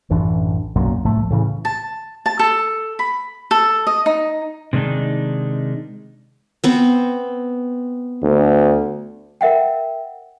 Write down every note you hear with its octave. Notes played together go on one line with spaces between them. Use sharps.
A1 F#2 E3 D4
B1 F#2 A#2 F#3
C2 A2 F3 A3
A2 C#3 E3
A5
A5
A4
B5
A4
D#5
D#4
C3 D#3 G#3 D4 D#4
B3 C4
D2
A#4 E5 F#5 G5